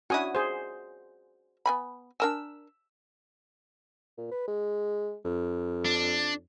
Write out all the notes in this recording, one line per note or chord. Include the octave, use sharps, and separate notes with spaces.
C#4 D4 E4 F#4 G#5 D#6
G#4 C5
B3 G#5 B5
D4 A#4 G#5 E6
A#2
B4
G#3
F2
D4